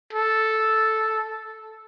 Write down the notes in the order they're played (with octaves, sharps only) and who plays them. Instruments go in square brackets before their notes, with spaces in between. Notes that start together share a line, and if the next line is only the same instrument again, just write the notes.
[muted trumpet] A4